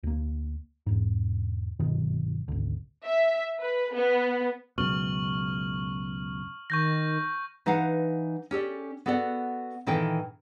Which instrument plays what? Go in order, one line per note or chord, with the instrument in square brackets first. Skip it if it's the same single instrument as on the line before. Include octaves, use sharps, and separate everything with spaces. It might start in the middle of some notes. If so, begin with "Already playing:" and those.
[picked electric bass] D2 A#3
E1 G#2
G1 F#2 B2 D#3
G#1 D2
[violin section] E5
B4
B3
[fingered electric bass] C#2 F#2 B2 [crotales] C#6 F6 F#7
[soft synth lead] D#3 [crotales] C#6 G6 A#6
[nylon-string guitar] E3 D#4 B4 F5 F#5
C#4 G4 A4 D5
B3 F#4 A4 D5 F#5
A#2 D#3 E3 A4 B4 G5